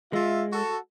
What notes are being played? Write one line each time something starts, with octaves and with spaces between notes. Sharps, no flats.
G#3 F4 E5
F#4 A4